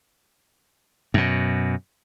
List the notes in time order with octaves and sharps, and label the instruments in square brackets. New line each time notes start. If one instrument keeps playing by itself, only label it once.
[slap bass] F#2 B2